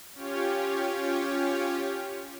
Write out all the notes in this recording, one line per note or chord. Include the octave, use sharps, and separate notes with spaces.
C#4 F4 G4 C#5